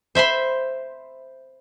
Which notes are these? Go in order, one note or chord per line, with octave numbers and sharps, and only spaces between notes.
C5 E5 B5 C6